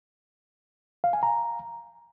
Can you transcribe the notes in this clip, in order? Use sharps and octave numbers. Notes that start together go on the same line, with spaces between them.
F5
G#5
A#5